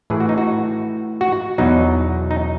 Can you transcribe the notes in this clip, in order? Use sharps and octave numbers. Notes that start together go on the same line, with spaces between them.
A2 E3 G#4
F#4
D#4
F#4
F#4
E2 B2 F#3 D#4
D#4